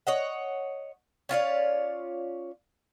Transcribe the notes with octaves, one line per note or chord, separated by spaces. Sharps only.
C#5 D#5 F#5
C#4 F4 C#5 D5